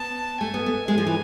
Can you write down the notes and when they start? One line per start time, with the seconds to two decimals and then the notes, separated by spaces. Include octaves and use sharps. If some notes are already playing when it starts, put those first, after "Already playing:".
Already playing: B3 A5
0.40 A3 G#5
0.54 B3
0.66 A3
0.88 G#3
0.98 F3
1.07 E3